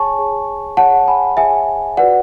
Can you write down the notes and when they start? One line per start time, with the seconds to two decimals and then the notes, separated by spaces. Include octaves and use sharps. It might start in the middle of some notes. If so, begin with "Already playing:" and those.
Already playing: G#4 C#5 G#5 A5 C#6
0.18 G#4 C#5
0.77 G#4 C#5 F#5 A5
1.08 G#5 B5
1.37 G#4 C#5 E5 G#5
1.97 F#4 B4 D5 F#5